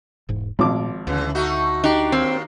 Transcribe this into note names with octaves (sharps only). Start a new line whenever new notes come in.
E1 G#2
G#1 A#2 F3 G#3 A3 D6
D2 C#3 E3
A3 D#4 F#4
D4 D#4 G4
D#2 A#3 C4